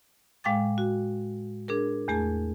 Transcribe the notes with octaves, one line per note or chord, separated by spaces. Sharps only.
A2 G#3 F5 G5 D6 A6
F#4
D4 G#4 A#4
E2 A3 G#4 A5